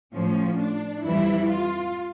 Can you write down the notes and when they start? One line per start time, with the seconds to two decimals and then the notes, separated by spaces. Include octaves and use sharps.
0.13 A2 F3 C#4
0.59 D4
1.04 F2 E3 G3 E4
1.49 F4